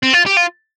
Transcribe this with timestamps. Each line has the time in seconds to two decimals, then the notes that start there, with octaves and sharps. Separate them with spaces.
0.03 C4
0.13 F4
0.26 G4
0.37 F4